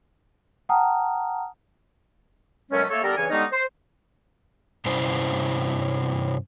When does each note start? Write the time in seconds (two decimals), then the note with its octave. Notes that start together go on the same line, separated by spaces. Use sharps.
0.69 F#5 G5 A5 A#5 D#6 F6
2.71 F#2 B2 F#3 G#3 A3 C#4
2.89 A3 A#3 A4 C#5
3.03 D3 G3 B3 G4 A4 A#4
3.16 G2 C#3 E3 C#5 G#5
3.30 D3 G3 G#3 B3 C#4 D#4
3.52 C5
4.85 G2 C3 C#4 E4 C5